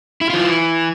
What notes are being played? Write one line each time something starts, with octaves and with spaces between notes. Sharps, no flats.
E4
E3 F4